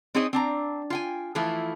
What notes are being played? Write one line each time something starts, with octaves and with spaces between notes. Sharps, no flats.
C4 D#4 G#4 C#5 D#5
C4 D4 A#5
F4 G5 G#5
E3 F3 A3 E4 F4